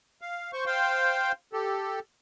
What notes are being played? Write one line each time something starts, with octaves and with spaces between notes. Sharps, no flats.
F5
C5 C#6
C5 F5 G5
G4 A4